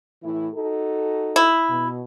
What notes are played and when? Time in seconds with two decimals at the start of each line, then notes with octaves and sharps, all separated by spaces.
0.23 A2 E3 E4
0.54 D#4 F#4 A4
1.36 E4
1.70 B2